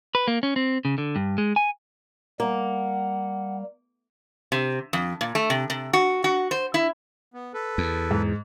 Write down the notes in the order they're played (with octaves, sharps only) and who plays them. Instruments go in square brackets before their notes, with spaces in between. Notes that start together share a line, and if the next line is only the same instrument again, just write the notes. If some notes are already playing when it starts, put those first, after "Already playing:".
[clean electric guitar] B4
A#3
C#4
C4
C#3
D3
G2
G#3
G#5
[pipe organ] G3 [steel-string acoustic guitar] A#3 [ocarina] F#5
[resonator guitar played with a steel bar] C3
F2
A#2
A3
C3
C3
F#4
F#4
C5
E4
[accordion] B3
A4 B4
[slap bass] E2
[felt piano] G#2